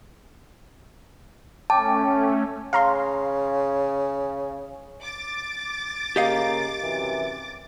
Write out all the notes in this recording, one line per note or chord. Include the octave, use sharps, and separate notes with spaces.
A3 C#4 G5 A5 D6
C#3 F5 A#5 C6
D6 A6
C#3 A#3 G4 D#5 F5
F#2 C3 E3